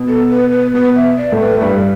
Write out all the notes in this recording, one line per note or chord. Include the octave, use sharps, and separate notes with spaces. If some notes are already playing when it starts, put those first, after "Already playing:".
Already playing: B2
A4
B4
B4
B2 B3 B4
E5
D5
A2 A3
B4
A3
G2 G3 B4